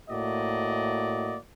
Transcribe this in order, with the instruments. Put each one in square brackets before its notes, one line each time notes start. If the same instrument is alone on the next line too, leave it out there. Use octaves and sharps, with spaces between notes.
[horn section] A2 A#3 F#4 D5 D#5